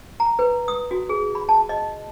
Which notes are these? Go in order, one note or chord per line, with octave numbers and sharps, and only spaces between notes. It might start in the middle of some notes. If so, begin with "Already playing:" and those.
A#5
B4
D#6
F#4
G#4
B5
A5
D#5